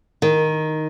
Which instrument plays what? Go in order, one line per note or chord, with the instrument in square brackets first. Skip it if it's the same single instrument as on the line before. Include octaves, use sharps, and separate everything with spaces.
[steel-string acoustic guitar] D#3